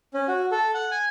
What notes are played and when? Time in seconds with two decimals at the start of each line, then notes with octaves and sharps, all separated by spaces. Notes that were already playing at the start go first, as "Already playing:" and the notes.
0.14 C#4
0.28 F#4
0.51 A4
0.74 F#5
0.91 G#5